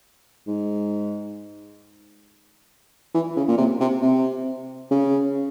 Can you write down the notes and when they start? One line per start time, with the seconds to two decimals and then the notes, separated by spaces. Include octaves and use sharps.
0.47 G#2
3.14 E3
3.36 C#3
3.48 A#2
3.58 C3
3.80 C3
4.02 C3
4.91 C#3